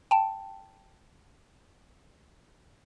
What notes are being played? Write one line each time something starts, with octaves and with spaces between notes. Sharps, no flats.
G5 A5